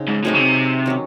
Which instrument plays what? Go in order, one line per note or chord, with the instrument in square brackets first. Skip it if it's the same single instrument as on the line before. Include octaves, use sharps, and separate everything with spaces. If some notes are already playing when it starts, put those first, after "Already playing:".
Already playing: [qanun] C#3 C4 D#4
[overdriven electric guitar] G#2
[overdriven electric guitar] A2 [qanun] F#3 C4 D#4 G#4
[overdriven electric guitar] C#3
C3
[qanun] D#3 F#3 C#4